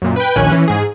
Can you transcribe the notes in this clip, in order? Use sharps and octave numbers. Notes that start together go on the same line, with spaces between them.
F#2 A#2
B4 G5
A#1 D#2 C#4 G#5 F#6
E3 C#4
G#2 G#4